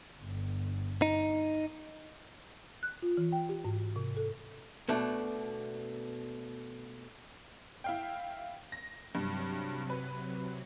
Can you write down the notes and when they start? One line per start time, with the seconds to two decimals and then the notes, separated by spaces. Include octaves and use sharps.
0.18 G1
1.02 D#4
2.83 F#6
3.02 F4
3.17 E3
3.32 G5
3.49 G4
3.65 G#2
3.96 C3
4.17 A4
4.89 B2 A3 D4
7.84 E4 F5 G5
8.72 A#6
9.15 G2 C3 F#3
9.90 B4